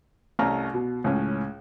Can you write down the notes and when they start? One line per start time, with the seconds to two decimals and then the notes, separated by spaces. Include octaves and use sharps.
0.39 C2 A3 C#4 A#5 F6
0.74 B2
1.04 C#2 A2 C#4